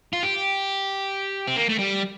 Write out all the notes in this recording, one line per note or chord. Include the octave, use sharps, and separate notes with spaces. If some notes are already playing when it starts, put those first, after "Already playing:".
F4
G4
C4
A#3
A3
G3